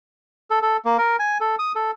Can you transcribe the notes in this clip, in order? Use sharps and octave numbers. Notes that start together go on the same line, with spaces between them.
A4
A4
A#3
A#4
G#5
A4
D#6
A4